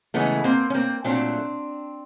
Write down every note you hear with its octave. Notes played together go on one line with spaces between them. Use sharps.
C#3 E3 G#3 A3 B3
A#3 C4
C#4
A#3 C4
A#2 F#3 A3 C4 D4